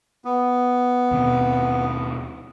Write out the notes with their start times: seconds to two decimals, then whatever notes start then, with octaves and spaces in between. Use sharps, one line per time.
0.25 B3
1.11 D#2 B2 C4